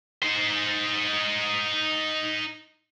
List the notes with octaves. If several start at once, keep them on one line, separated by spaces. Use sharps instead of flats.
D#4 C5